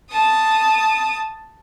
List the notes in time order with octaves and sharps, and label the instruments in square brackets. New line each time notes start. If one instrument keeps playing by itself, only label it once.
[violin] A5 D#6